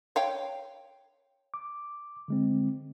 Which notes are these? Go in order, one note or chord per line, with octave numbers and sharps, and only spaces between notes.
C#5 F5 G5
D6
D3 G#3 C4